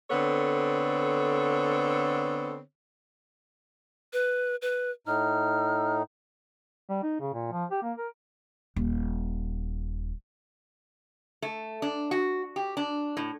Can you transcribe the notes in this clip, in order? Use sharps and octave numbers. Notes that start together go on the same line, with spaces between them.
D3 B3 C4 A4 C#5
B4
B4
A2 D#4 F6
G3
D#4
C#3
A#2
F3
G4
A#3
A#4
D#1
A3
D4
F#4
G4
D4
A2